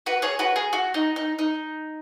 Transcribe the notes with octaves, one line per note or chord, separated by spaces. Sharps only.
F#4 B4
G#4 C#5
F#4 B4
G#4
F#4
D#4
D#4
D#4